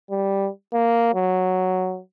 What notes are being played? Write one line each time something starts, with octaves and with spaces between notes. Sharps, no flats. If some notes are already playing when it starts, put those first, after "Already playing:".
G3
A#3
F#3